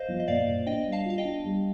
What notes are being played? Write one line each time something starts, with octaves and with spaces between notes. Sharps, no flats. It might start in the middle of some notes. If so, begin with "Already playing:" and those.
Already playing: C5 D#5 F5
F3
D#5
A#2 D5 F5
A#2
D4 D#5 G5
G3
F5 A5
F4 F5
D#5 G5
D4
G3